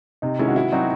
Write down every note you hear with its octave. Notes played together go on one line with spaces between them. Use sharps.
C3 D#4
D#3 G#3 C#4 E4
F#4
D#3 E4
F#3 C4 D#4 F#4